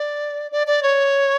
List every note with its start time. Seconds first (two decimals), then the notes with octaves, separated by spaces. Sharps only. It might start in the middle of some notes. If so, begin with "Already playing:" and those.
Already playing: D5
0.52 D5
0.67 D5
0.83 C#5